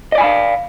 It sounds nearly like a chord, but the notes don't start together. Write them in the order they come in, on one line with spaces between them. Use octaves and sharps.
D#5 D5 G#5 B5 F5